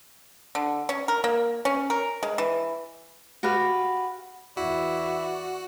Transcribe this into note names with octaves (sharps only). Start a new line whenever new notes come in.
D3
C#4
A#4
A#3
C#4
A#4
G#3
E3
F#4 G4 B4 F5
E2 E4 F#4 D5